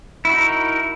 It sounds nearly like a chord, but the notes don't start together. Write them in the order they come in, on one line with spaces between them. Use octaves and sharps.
E4 F#4 D#4 A#4